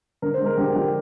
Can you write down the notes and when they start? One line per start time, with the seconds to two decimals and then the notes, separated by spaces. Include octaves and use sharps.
0.22 D3 A#4
0.34 C5
0.40 G#3
0.46 A#4
0.57 D3 G4
0.75 F3 G4